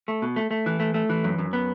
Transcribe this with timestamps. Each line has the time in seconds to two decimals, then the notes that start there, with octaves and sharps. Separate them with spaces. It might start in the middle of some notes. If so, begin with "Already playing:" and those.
0.08 A3
0.22 B2
0.36 A3
0.51 A3
0.66 E3
0.80 A3
0.94 A3
1.09 E3
1.24 F#2
1.38 F#2
1.53 B3